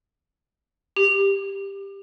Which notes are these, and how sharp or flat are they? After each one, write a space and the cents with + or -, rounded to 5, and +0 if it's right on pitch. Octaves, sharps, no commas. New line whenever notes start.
G4 +10